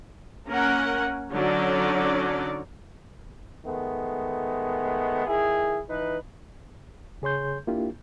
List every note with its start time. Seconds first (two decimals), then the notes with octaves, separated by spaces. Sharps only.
0.48 A#3 C#4 A#4 F#5
1.32 D3 F#3 C#4 D#4 C#5 D5
3.65 D#3 G#3 A3 B3
5.27 D#3 E4 G#4
5.89 E3 D#4 B4
7.22 C#3 G#4 C#5 C6 G6
7.67 A#3 D4 E4 F4 G4